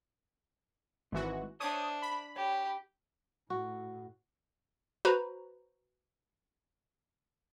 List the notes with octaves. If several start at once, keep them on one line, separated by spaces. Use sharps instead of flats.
G#1 E3 G#3 F#4
D4 C5 C#5 E5 F5 D#6
B5
G4 C#5
A2 F#4
F#4 B4 C5 A#5 B5